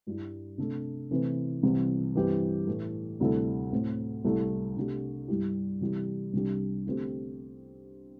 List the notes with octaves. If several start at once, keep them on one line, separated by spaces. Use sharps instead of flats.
G2 G3 E4
C3 A3 D4 A4
C3 E3 A3 C4
C2 C3 E3 C4
G2 E3 C4 E4 G4
A2 E3 A3
D2 C3 G3 E4 A4
A2 A3 C4
C2 C3 A3 E4 A4
C3 A3 D4 G4
G2 G3 E4 G4
C3 E3 G3 E4 G4
C2 C3 G3 D4 G4
D3 A3 C4 G4